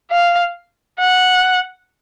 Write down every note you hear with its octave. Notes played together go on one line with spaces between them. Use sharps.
F5
F#5